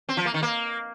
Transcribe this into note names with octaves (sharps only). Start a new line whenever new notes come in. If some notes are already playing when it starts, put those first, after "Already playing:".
C4
F3
A#3
D#3
A#3